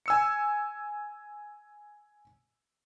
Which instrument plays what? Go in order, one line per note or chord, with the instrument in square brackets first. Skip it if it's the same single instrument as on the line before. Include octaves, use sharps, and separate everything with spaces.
[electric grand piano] G#5 E6 C#7